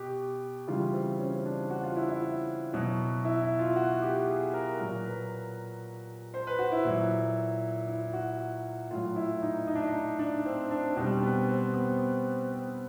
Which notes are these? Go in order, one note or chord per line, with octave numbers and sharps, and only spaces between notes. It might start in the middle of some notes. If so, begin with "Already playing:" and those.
Already playing: B2 G4
C#3 E3 G3 F4
C4
C#4
D4
F#4
F4
E4
E4
B2 F#3
E4
E4
F4
F#4
G4
G#4
A#4
A#2 F#3 A#4
B4
C5
B4
F#4
E4
A#2 F#3
E4
F#4
A2 F#3 F4
E4
D#4
D#4
D4
D#4
D4
C4
D4
B2 G3 C4
B3
C4
B3
C4